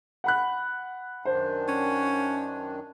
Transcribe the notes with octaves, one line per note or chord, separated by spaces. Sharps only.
F#5 B5 F#6
F#2 D#3 D4 C5
C#4